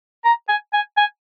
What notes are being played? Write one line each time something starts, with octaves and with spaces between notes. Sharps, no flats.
A#5
G#5
G#5
G#5